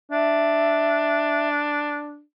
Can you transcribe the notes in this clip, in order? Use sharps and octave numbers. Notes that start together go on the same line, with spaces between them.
D4 E5